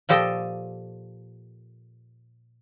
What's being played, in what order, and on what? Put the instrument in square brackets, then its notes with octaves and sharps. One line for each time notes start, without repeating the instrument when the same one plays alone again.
[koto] A#2 F3 G4 A4 D#5 G5